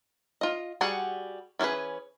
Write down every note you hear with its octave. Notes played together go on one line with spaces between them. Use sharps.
F4 D#5
G3 F#4 G#4 F#5
E3 C#4 F#4 G#4 B4